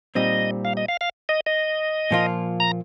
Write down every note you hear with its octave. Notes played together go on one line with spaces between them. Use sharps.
A#2 G3 C4 D#4 D#5
F5
D#5
F5
F5
D#5
D#5
A#2 F3 A#3 F4
A#5